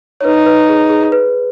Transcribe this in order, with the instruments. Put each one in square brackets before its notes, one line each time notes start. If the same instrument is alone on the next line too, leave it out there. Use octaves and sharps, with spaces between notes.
[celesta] C#5
[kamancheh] D#4 [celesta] B4
[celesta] B4
G#4
G#4
B4